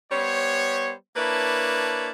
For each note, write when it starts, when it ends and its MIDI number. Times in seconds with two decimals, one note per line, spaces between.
0.11 0.92 55
0.11 0.92 59
0.11 0.92 72
0.11 0.92 73
1.15 2.11 58
1.15 2.11 62
1.15 2.11 64
1.15 2.11 71
1.15 2.11 73
1.15 2.11 81